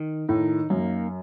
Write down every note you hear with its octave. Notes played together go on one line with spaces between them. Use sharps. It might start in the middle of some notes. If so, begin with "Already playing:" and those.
Already playing: D#3
A2 D#4
F#2 A#3